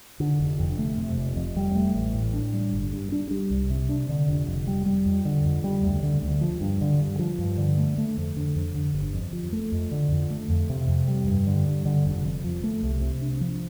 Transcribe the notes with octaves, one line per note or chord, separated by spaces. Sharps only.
D3
F1
F2
A3
C3
F1
F2
G3
A3
A1
A2
D4
G3
G1
G2
D4
G3
C2
C3
D4
D3
F1
F2
G3
G3
F2
D3
F2
G3
D2
D3
D2
F3
G2
D3
G2
F3
G2
D3
A3
A3
F2
D3
F2
D3
G1
F2
F3
A3
F2
D3
F2
A3
F2
C3
F2
G3
G2
D3
G2
D3
F1
F2
F3
A3
C2
C3
D4
F3